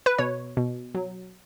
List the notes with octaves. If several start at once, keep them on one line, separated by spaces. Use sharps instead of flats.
B4
B2 C#5
B2
F#3